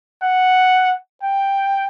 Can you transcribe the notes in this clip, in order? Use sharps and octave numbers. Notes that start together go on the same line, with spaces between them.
F#5
G5